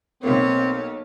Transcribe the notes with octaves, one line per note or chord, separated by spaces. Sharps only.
B1 A#3 C4 C#5